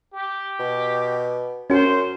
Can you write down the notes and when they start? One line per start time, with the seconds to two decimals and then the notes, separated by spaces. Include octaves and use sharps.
0.14 G4
0.59 B2
1.70 F#2 C#4 F#4 C5